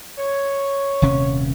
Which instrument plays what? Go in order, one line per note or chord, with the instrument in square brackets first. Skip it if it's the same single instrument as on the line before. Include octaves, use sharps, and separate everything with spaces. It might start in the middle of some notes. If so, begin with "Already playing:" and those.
[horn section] C#5
[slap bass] D#1 C3 C#4